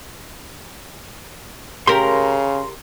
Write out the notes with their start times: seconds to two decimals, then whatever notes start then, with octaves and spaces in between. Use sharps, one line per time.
1.87 C#3 G4 A#4 A#5 C6